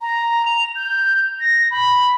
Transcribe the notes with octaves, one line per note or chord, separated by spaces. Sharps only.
A#5
F7
G6
A#6
B5